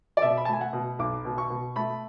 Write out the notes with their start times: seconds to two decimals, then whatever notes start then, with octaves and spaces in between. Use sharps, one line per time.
0.17 D5
0.22 B2 E5
0.37 B5
0.45 A5
0.48 A3 G#5
0.61 F#5
0.73 B2
0.99 B1 D6
1.25 B2
1.38 C#6
1.50 B2
1.76 A3 B5